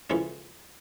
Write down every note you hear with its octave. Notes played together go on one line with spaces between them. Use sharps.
F2 C#3 E3 G#3 C#4